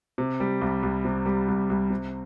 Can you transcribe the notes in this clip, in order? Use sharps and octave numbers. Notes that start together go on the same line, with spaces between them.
C3
G3
C2
C2
C3
G3
C2
C2
C3